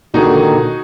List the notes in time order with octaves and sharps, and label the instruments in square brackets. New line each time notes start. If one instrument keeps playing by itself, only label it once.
[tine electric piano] A#2 D3 [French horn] D#3 [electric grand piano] D#4 F#4 G#4